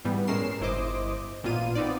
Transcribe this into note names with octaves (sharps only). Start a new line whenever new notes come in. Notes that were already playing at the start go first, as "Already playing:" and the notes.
G#2 E3 G3 B3
A2 G#3 C#4 A#4 C7 E7
G1 E4 C5 D#5 D6
A1 A#2 B3 F4 D#7
B3 C4 D#4 D5